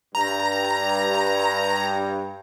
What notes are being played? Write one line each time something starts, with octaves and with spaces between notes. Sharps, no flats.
G2 A#5